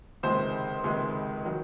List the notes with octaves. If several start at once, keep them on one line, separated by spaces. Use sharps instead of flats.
C#2 C3 D#3 G#3 C5
C#2 C3 D#3 G#3
D#3 F#3